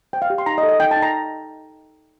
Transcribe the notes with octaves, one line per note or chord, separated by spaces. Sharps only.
C5 G5
F5
G4
C6
D#4 A#5
D#5
A4
D#5
D#4 G5
A5
D#4
A#5